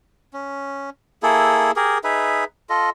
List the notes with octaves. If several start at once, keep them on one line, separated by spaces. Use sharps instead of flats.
C#4
A#3 E4 G#4 A4
G4 G#4 A#4
D#4 G#4 B4 E5
F4 A4 D#5